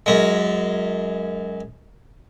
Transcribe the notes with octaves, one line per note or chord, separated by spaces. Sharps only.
F#2 G#3